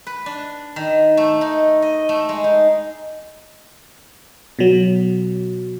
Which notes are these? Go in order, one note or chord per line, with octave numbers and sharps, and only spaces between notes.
B4
D4
D#3
A3
D#4
D#5
A3
G#3
D#4
B2 F#3